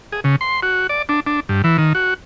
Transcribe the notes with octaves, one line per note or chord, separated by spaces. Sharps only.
G#4
C#3
C6
F#4
D5
D4
D4
G2
E3
D#3
F#4